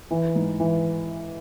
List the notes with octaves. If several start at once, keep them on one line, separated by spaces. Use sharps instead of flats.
E3
G#2
E3